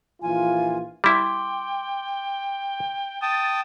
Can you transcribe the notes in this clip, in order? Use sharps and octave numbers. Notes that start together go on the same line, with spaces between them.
A#1 E3 F4 G#5
G3 E4 G5 C6 D6
G5 A5 D#6 A6